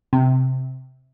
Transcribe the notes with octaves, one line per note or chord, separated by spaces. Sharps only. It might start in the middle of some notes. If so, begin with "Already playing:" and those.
C3